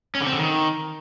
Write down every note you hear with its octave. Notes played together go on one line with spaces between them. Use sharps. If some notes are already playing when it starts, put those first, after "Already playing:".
C#4
D3
C4
D3
D#3